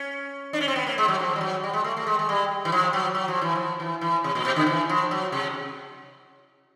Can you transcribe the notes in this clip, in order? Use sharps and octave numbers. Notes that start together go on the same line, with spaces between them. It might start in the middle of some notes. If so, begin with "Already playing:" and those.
Already playing: C#4
D4
C#4
C4
B3
A#3
G#3
F#3
F3
G3
F#3
G3
G#3
A3
A3
G#3
G#3
G3
E3
F3
F#3
F#3
F3
E3
F3
E3
E3
C3
A#2
B2
D3
E3
F3
F#3
C3